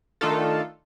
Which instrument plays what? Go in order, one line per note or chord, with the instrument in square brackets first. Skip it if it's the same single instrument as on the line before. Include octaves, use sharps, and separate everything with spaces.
[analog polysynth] D#3 A3 D4 D#4 F4 A4